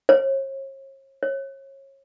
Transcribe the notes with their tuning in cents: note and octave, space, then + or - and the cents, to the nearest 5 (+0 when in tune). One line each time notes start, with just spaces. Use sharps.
C#5 -40
C#5 -30